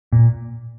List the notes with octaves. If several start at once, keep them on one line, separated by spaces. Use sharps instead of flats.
A#2